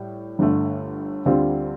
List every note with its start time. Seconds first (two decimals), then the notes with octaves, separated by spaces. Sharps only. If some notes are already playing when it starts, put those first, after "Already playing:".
Already playing: A2 G3
0.39 G1 G2 D3 A3
1.25 D2 D3 G3 C4 F4